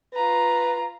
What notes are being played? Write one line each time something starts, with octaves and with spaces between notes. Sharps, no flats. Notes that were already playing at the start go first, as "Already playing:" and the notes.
F4 B4 A#5